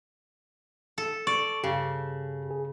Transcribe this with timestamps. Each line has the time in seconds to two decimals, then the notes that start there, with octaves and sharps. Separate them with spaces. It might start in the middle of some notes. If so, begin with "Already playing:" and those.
0.98 A4
1.27 D5 C#6
1.64 G2 C#3 G4
2.51 G#4